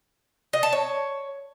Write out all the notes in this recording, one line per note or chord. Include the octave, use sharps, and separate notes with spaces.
D#5
A5
C#5